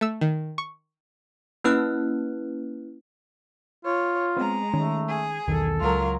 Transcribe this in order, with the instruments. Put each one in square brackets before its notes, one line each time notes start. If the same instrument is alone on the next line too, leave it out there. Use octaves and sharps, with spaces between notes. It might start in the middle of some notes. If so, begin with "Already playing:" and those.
[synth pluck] A3 E6
D#3
C#6
[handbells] A#3 C#4 E4 B4 F6 F#6
[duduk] F4 [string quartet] C#5
[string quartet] G#3 A#5 [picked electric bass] B3 C4
[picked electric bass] D#3 C#4 [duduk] A3
[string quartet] G#4
[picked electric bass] B1 E2 D#3 [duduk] A4
[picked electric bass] C#2 [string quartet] F#3 F4 A#4